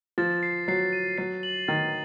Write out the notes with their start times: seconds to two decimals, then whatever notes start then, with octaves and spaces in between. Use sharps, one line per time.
0.18 F3 A6
0.43 C7
0.68 F#3 C7
0.93 D#7
1.18 F#3 C7
1.43 F#7
1.68 D#3 A6